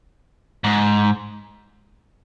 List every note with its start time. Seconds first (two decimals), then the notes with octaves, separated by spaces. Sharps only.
0.64 G#2